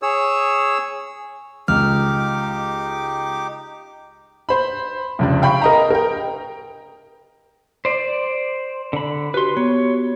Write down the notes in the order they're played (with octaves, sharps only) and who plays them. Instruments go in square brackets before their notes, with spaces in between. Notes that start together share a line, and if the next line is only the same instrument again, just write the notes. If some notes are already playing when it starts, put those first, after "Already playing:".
[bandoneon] G#4 C#5 E6
[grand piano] C#2 [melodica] D#4 G4 D6 [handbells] F6
[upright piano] C5 B5
F1 C#2 D4
F5 G5 B5 C#6
A#4 D#5 A#5
A#4 G5
[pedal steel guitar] C5 D5
D3 B5
[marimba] F#4 G4 [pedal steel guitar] B4 C6
[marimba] B3 [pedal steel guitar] C#5